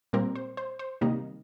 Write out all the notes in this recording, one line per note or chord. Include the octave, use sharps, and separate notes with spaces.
A#2 G3 C4 A#4
C5
C5
C5
C3 D#3 G3 A#3 D#4 D#5